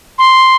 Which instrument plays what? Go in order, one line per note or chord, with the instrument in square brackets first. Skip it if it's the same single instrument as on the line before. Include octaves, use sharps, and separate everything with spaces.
[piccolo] C6